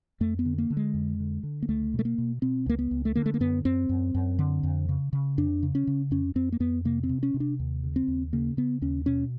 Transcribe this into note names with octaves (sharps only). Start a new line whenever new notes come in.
F2 A3
B3
D3
A#3
D3
G#3
F2
D3
D3
A#3
C#2 A3
B2
A3
A#3
B2
B2 C4
C#2 A#3
B3
C#2
A3
D3 A#3
A3
A#3
F#2 B3
F#2 C4
F#2
F#2
D3
F2
C#3
C#3
F2 D4
C#3
C#4
C#3
F2 C#4
F2 C4
A#3
F2 B3
C3 A#3
C4
C3
C#4
C3
D4
D#2
C#3
C4
D#2
C#3 A#3
C#3 B3
D#2 C#4
B2 C#4